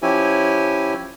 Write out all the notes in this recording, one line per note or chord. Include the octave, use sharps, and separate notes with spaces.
F3 C#4 E4 G4 G#5